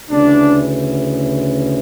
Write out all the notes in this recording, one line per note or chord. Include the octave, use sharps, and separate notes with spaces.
D2 C#3 E3 D4